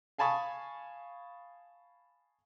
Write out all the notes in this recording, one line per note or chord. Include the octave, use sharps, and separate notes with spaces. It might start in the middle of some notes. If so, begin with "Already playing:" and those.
F5 G#5 A5 B5 C#6 D#6